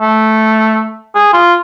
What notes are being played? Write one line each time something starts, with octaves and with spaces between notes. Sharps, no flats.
A3
G#4
F4